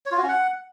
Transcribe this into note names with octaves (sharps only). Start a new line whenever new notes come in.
C#5
F4
F#4
C#4
F#5